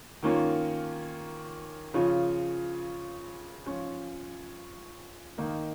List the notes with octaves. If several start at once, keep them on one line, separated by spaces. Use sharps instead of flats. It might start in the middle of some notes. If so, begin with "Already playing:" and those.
D#3 A#3 C#4 F4
C#3 F3 C#4 F4
F3 C#4 F4
D#3 A#3 D#4